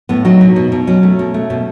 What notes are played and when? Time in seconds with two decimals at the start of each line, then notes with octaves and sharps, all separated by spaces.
0.09 A2 B3
0.25 F#3 D#4
0.41 B2
0.56 B2
0.72 B2
0.87 F#3 C#4
1.03 A3
1.19 B2
1.34 A3
1.50 B2